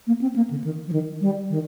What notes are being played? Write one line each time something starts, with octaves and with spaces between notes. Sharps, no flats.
A#3
C4
A#3
D3
D#3
F3
D#3
G3
D#3